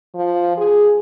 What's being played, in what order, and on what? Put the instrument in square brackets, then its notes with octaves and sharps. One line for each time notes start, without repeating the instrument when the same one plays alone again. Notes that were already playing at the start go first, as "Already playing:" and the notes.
[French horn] F3
G#4